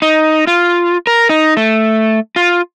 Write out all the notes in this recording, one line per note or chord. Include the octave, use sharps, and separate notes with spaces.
D#4
F4
A#4
D#4
A3
F4